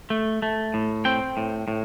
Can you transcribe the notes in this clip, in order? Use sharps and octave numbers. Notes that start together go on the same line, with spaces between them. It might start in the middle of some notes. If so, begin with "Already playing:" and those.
A3
A3
A2
C4 G5
A2
A2